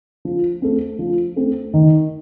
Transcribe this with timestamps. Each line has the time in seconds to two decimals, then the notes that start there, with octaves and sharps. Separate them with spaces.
0.25 F3
0.62 A3 C4
0.99 F3
1.36 A3 C4
1.74 D#3